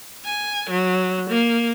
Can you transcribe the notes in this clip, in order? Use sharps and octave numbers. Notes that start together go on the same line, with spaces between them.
G#5
F#3
A#3